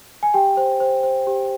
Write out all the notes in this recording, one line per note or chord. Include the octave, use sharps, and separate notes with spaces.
G#5
G4 G5
C5
C5
C5
G4